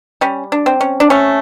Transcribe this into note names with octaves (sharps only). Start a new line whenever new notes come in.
G3 C#4
D4
C4
C#4
D4
A3 C#4